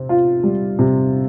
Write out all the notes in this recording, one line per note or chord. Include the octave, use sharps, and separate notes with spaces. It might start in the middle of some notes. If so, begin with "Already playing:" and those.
Already playing: C3 C4
F4
G3
C3